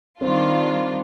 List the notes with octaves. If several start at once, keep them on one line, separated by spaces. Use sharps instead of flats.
D#3 G3 C4 D4 F4